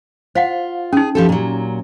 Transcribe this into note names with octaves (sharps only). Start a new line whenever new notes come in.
F4 C5 F5 F#5
C#4 D#4 G#4
F3 G4 A4
A#2 F#3